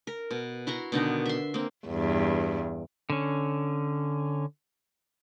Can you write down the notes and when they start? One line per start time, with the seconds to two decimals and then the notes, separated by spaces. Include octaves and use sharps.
0.07 A#4
0.31 B2
0.67 E4 F#4 A#5 C6
0.92 B2 D3 D#3 D#4
1.26 E5 C6
1.54 A#3 C4
1.87 E2 G2
3.10 D3 C#4